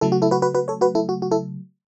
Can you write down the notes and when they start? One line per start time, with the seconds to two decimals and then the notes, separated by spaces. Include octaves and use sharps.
0.01 C#3 F#3 A3 E4 A4
0.12 F#4
0.22 E4 A4
0.31 F#4 B4
0.42 F#4 B4
0.55 F#4 B4
0.68 A4 C#5
0.81 F#4 B4
0.95 E4 A4
1.09 F#4
1.22 F#4
1.31 E4 A4